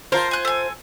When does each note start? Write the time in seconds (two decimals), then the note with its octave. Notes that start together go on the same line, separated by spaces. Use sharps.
0.12 F4 A#4 C5 A5 F6
0.31 G#5 F#6
0.45 A4 G#5